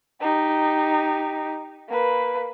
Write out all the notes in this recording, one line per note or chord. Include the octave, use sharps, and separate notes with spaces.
D#4 G4
A#3 B4